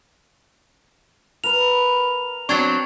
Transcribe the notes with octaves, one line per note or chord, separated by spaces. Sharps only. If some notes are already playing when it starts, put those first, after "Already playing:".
A#4 B4 F7
F#3 C4 D4 C#6 G#6 A6